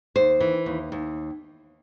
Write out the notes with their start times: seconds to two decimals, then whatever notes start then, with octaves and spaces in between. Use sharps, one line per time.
0.16 D#2 C5
0.40 E3
0.66 D#2
0.92 D#2